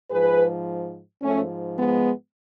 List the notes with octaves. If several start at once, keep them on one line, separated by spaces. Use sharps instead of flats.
G#2 F3 G#4 B4
G#2 F3 A3 C#4
G#3 B3